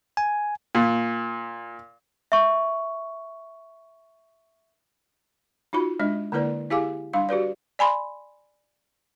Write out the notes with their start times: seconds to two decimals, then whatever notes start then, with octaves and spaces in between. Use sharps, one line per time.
0.17 G#5
0.75 A#2
2.32 E5 C#6
5.73 D#4 F4 F#4 B5
5.99 G#3 D4 D#5
6.32 D3 A#3 E4 A#4 B4 D5
6.70 E4 G4 G#4 F5 G#5 D6
7.13 G3 D4 F5 C6
7.29 F#4 G4 B4 D5
7.79 D5 G#5 B5 C6